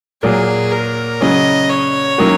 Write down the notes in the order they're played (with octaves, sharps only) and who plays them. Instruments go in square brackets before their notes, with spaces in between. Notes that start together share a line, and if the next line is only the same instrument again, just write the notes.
[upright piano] A#2 F#3 A#3 [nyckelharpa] G#4
[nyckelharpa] A#4
[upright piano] C#3 F#3 C#4 [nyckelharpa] D#5
[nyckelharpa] C#5
[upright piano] D#3 F#3 A#3 C#4 F#4